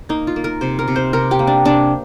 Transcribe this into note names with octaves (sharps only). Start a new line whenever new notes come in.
A#3 D#4
F4
A#3
A#4
C3 C5
A#4
C3
C5
C3 A#4
G4
A#3
D4
C3 D4